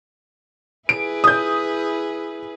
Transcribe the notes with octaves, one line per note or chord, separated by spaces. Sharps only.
E4 G#4 B4 D7
D#6 G6